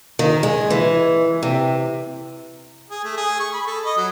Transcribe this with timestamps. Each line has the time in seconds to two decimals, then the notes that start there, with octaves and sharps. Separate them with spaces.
0.19 D#3
0.43 G#3
0.70 E3
1.43 C3
2.90 G#4
3.04 A3
3.17 G#4
3.40 C#6
3.54 B5
3.67 A4
3.85 D#5
3.97 F#3